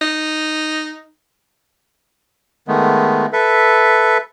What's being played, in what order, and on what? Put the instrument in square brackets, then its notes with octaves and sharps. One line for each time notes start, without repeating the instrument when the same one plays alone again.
[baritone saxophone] D#4
[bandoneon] D#3 G#3 A3 B3
A4 B4 E5